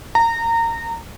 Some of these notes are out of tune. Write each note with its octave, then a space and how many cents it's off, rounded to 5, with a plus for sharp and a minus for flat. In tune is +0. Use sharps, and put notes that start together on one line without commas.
A#5 -25